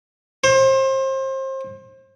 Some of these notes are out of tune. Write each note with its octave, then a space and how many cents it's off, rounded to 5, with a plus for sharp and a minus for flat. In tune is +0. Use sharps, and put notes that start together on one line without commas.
C5 +30